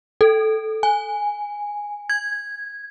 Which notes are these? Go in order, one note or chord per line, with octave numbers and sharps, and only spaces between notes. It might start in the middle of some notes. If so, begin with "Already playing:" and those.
A4
G#5
G#6